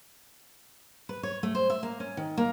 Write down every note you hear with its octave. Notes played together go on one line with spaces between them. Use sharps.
B4
C#5
A3
C5
E5
A#3
C#4
D#3
A#3